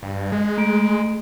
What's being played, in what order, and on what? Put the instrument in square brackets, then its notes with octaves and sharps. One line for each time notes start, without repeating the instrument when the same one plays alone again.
[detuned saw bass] G2
G#3
[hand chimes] A3 D7